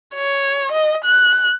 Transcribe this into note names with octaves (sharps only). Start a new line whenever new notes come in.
C#5
D#5
F#6